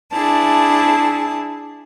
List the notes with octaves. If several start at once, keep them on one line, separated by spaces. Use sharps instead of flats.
D4 E4 G#4 A5